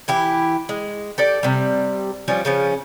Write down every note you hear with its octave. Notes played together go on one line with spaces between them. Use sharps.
E3 E4 G4
G#3
G4 A4 D5
C3 G3
F3 G3 C#4
C#3 F3 C#4